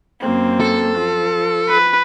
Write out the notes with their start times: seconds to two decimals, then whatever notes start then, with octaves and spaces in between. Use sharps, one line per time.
0.20 F#2 A#3 C4
0.60 A4
0.96 F3
1.69 B4